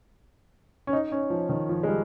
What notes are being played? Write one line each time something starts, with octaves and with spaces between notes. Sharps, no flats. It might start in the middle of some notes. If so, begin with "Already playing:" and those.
C#4
D#4
C#4
F3
D#3
F3
G#3
G3